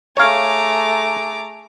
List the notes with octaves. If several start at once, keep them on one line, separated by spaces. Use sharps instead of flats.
A3 G#4 C#5 F5 A#5 D6